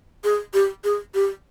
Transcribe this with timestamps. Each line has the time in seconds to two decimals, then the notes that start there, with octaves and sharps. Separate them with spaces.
0.24 G#4
0.54 G4
0.84 G#4
1.14 G4